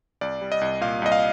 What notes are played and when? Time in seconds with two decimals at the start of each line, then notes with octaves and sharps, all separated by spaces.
0.21 C2 D5
0.42 G3
0.52 D#5
0.61 C2
0.81 A#2 F5
1.02 C2 D#5
1.12 F5